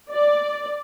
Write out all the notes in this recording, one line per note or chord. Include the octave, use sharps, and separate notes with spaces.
D5